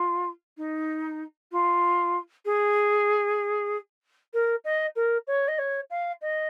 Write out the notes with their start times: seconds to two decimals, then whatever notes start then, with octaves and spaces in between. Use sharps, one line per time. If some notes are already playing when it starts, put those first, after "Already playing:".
Already playing: F4
0.57 D#4
1.52 F4
2.45 G#4
4.34 A#4
4.65 D#5
4.96 A#4
5.27 C#5
5.48 D#5
5.59 C#5
5.90 F5
6.21 D#5